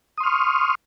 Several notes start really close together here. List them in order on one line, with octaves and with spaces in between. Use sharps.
D#6 C6 F6 C#6